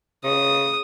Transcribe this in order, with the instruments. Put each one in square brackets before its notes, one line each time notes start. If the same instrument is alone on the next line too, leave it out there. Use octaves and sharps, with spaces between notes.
[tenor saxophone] C#3 [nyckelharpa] D#6